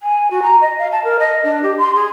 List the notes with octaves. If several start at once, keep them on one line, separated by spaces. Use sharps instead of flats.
G#5
F#4
A#5
D#5
F5
A5
A#4
D#5
D4
G4
C6
G#4